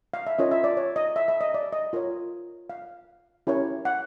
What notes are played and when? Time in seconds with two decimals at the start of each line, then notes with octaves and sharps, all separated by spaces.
0.14 F5
0.27 E5
0.38 C#4 F4 A#4 C#5 D#5
0.51 E5
0.64 D5
0.77 C#5
0.96 D#5
1.16 E5
1.28 E5
1.41 D#5
1.54 D5
1.73 D#5
1.93 F4 A#4 C#5
2.70 F5
3.47 C#4 E4 G4 A#4 C#5
3.85 F#5